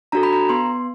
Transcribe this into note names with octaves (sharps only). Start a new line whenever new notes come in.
D4 F#4 A4 A#5
B5
A#5
B3 C6